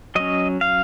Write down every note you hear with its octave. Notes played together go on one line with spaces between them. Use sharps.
F#3 C#4 D#5
F5